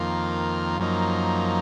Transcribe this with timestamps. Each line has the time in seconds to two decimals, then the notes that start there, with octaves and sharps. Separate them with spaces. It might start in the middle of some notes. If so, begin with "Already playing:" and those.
Already playing: F2 D#3 A#3 F4
0.79 F#2 F3 A#3 D#4